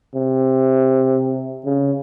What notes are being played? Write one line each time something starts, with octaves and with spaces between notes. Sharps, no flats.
C3
C#3